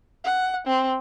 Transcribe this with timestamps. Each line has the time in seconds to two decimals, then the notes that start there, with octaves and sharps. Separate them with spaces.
0.24 F#5
0.67 C4